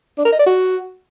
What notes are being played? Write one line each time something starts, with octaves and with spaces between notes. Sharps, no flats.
D4
A#4
D#5
D5
F#4